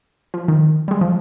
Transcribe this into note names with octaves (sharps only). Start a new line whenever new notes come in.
F3
D#3
G3
G#3
F3